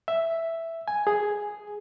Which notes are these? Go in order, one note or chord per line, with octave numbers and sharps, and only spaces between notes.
E5
G#5
G#4